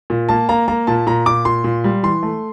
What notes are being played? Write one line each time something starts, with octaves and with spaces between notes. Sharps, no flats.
A#2
A#3 A5
A#3 A#5
A#3 A#5
A#2 A5
A#2 A#5
A#2 D6
A#2 C6
A#2
G3
E3 C6
A3